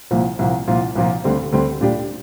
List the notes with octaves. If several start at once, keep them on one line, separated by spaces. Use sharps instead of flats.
C2 A#2 F3 A#3
C2 A#2 F3 A#3
C2 A#2 F3 A#3 F4
C2 A#2 F3 A#3 F4
D2 D3 G3 C4
D2 D3 G3 C4
A#2 G3 D4 G4